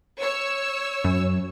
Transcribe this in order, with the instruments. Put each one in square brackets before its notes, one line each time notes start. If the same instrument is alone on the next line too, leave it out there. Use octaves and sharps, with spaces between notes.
[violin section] C#5 E6
[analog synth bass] F#2